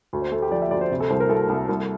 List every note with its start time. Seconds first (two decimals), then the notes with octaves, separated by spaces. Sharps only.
0.13 D2
0.22 C5
0.32 A3 A4
0.42 G4
0.51 F3 D5
0.62 E5
0.71 D2 D5
0.81 C5
0.91 C3
1.00 A4
1.10 C2 C5
1.20 A#4
1.29 C2 A4
1.49 C2
1.69 C2